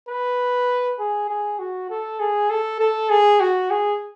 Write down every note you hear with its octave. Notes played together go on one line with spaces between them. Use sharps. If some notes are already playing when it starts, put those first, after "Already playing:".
B4
G#4
G#4
F#4
A4
G#4
A4
A4
G#4
F#4
G#4